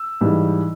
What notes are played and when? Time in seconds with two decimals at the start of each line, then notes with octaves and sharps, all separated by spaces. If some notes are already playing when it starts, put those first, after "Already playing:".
Already playing: E6
0.21 G#2 E3 G3